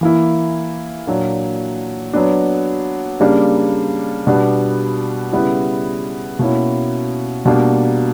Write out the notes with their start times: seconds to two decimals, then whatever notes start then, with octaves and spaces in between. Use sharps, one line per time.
0.01 E3 A#3 E4
1.07 A#2 F#3 A#3 D4
2.13 F#3 B3 D4
3.20 C#3 G3 A#3 D4
4.27 B2 G3 B3 D4
5.33 C#3 G3 B3 E4
6.39 B2 A#3 C#4 E4
7.45 B2 G3 A#3 D4